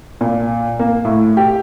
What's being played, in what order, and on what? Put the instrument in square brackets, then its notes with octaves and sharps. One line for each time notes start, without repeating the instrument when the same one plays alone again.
[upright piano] A#2
A#3
A2
G4